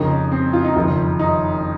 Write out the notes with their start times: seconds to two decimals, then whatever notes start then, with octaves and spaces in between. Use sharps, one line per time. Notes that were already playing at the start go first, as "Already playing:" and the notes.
Already playing: F2 C#3 F3 A#3 D#4
0.32 C4
0.53 F4
0.64 D#4
0.75 F#1 F2 D#3 F4
1.19 D#4